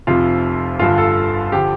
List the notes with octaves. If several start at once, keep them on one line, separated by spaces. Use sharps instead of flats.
F1 F2 C3 F3 F4
G1 G2 D3 F4
A4
D3 F3 G4